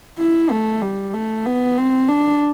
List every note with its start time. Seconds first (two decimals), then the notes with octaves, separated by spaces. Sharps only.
0.18 E4
0.51 A3
0.82 G3
1.13 A3
1.46 B3
1.78 C4
2.08 D4